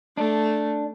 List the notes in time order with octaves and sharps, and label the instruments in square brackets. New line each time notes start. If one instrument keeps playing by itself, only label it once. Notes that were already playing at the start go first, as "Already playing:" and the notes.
[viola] A3 [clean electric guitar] D4